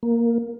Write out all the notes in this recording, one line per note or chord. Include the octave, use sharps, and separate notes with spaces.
A#3